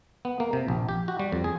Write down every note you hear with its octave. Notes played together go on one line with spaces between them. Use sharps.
B3
A#3
C3
A#1
G4
F#4
G3
F2
G#4